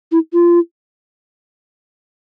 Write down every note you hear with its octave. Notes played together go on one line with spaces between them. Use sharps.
E4
F4